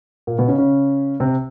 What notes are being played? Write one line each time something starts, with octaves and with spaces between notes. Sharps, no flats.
A#2 A#3
B2 B3
C#3 C#4
C#3 C#4
C3 C4